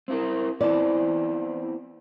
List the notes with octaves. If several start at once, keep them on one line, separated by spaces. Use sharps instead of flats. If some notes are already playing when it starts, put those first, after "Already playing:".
C4 E4 A#4
E3 B3 C4 E4 C5 D5